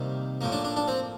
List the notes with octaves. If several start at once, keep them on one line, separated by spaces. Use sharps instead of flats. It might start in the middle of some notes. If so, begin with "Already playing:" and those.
Already playing: C3 D#3 G3 A#3
A2 F3 A#3
D4
D4
D4
C4